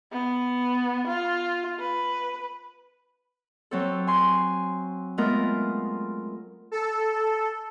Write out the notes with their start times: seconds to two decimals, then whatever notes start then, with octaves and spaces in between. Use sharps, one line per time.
0.12 B3
1.07 F4
1.79 B4
3.71 F#3 C4 A4
4.07 G#5 C6
5.18 G#3 A3 B3 F4 A#4
6.72 A4